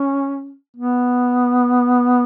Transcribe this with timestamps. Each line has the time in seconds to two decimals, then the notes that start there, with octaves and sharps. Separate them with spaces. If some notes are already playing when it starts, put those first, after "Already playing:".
Already playing: C#4
0.77 B3